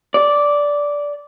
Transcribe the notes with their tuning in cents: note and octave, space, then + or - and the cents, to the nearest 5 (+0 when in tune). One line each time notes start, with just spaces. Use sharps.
D5 -10